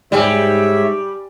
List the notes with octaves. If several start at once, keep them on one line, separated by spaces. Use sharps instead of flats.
G#2 G3 C#5 D5 E5 G5 G#5